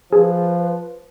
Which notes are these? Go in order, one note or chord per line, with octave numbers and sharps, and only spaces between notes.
F3 G#4 B4